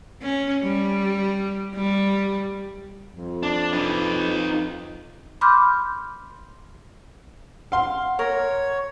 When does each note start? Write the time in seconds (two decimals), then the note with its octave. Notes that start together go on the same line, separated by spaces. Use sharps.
0.22 C#4
0.62 G3
1.75 G3
3.09 F2
3.43 D4
3.73 D#4 B4
5.41 B5 C6 D6 F6 G6
7.72 F5 F#5 C6
8.19 A#4 C#5